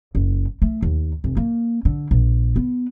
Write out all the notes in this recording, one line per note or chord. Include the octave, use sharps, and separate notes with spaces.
F#1
A3
D#2
F1
A#3
D3
A#1
B3